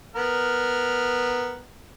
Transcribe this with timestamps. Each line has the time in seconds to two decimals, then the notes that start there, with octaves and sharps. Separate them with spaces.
0.15 B3 A#4 F6